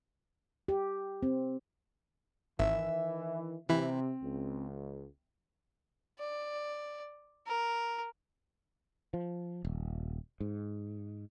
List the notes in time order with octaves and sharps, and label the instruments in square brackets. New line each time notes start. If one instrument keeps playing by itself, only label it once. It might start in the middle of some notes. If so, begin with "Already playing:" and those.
[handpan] G4
C4
[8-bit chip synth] G#1 [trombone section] D#3 E3 [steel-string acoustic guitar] E5
[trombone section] C3 [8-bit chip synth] E3 E4 [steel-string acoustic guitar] C4
[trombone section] C#2
[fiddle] D5
A#4
[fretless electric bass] F3
D#1
G#2